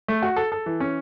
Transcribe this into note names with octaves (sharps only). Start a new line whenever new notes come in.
A3
F#4
A4
A4
E3
C#4